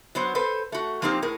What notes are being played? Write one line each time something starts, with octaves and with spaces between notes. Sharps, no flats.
F#3 B3 C5
A4 B4 C5
A3 F#4
F3 A#3 C4 D#4 G4
A2 G#4 A#4